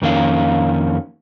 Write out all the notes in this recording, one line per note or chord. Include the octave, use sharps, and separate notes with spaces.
F2 D#3 A#3 C#4 F5